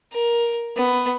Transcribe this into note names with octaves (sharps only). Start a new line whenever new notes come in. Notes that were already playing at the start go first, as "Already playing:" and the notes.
A#4
B3